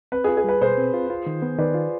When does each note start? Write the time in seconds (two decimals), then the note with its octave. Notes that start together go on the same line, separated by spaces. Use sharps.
0.12 C4 B4
0.24 F4 G#4
0.37 G#4
0.44 G3 B4
0.61 B2 G#4 C5
0.78 C4
0.94 F4
1.10 F4
1.27 D#3
1.42 B3
1.58 D#3 B4 D5
1.75 F4